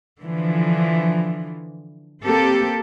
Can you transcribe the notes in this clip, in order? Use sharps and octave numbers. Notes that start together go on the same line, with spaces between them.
D3 E3 F3
A#3 C4 G4 A4